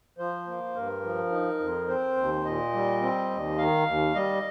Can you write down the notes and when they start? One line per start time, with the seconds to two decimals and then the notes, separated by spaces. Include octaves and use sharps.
0.18 F3 C5
0.47 A#3
0.75 G2 A#4
1.04 F3
1.32 D#4
1.59 F2
1.88 C4 C5
2.17 D#2
2.45 A#2 D#5
2.73 G3
3.01 C4
3.30 D#2
3.58 D#3 F5
3.87 D#2
4.15 G3 D#5